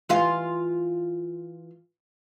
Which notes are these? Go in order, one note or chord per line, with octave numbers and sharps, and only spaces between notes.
E3 F4 F5